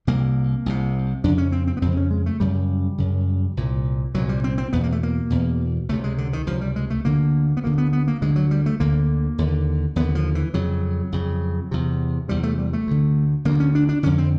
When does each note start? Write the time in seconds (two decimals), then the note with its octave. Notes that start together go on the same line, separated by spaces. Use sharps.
0.07 C2 C3 A#3
0.66 C2 C3
1.24 F2 C#3 D4
1.38 C#4
1.52 C4
1.67 C4
1.77 B3
1.82 F2 C#3 C4
1.97 C#4
2.11 G#3
2.26 A3
2.40 F#2 C#3 G3
2.98 F#2 C#3
3.57 C2 A#2
4.14 C2 A#2 F#3
4.29 G3
4.44 C4
4.58 C4
4.73 E2 B2 B3
4.83 A#3
4.92 A3
5.03 A#3
5.30 E2 B2
5.89 C#2 C3 A3
6.04 G#3
6.18 D3
6.33 D#3
6.47 C#2 C3 F3
6.61 G3
6.76 G#3
6.90 A3
7.05 D2 D3 A#3
7.57 B3
7.64 D2 D3 A#3
7.78 B3
7.93 B3
8.07 A#3
8.21 D2 D3 G#3
8.36 F#3
8.51 G3
8.66 A3
8.80 D2 D3 A#3
9.38 D#2 D3
9.96 D#2 D3 B3
10.15 F3
10.35 E3
10.54 F2 C#3 F#3
11.12 F2 C#3
11.71 E2 C3
12.28 E2 C3 G3
12.43 A3
12.58 G3
12.73 A3
12.87 D2 D3
13.45 D2 D3 A#3
13.60 C#4
13.75 D4
13.89 D4
14.03 F2 D3 C#4
14.18 C4